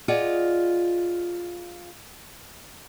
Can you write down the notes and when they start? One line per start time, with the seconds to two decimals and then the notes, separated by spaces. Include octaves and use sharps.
0.08 F4 G#4 D5 D#5 F#5